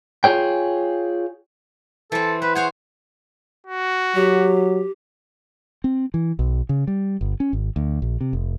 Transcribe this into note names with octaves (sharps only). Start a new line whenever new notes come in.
F4 G#4 C#5 G5
E3 C4 A4
C4 B4
G#4 C5 C#5 F#5
F#4
F#3 G4
C4
E3
B1
C#3
G3
G1
C#4
G#1
D2
A#1
C3
F1